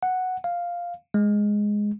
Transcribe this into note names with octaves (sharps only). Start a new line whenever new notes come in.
F#5
F5
G#3